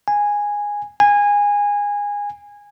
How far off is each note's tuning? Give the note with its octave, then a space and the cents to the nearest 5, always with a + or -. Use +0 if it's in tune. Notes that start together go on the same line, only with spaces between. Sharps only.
G#5 -10
G#5 -20